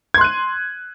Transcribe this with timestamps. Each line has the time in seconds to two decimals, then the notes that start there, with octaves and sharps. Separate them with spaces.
0.14 G#6
0.18 C6
0.21 F#6
0.24 D#7